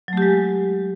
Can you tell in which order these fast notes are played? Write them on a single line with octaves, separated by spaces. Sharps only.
F#3 A3 G4 G#3